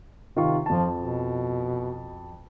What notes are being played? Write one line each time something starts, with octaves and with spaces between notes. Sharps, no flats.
C3 D#3 F4 C#6
F2 F3 A5
B2